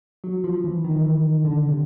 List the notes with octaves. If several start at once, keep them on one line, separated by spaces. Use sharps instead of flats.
F#3
F3
E3
D#3
E3
D#3
D3
C3